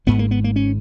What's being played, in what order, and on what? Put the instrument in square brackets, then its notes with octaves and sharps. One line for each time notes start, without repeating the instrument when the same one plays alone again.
[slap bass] G#1 G#2 B3
A#3
B3
A#3
C#4